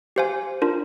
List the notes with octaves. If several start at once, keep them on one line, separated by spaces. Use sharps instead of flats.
G4 C5 F5 G#5
D4 F4 A#4